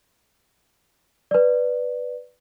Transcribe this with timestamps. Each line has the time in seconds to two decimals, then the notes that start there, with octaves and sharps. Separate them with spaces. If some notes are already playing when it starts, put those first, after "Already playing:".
1.31 B4 D5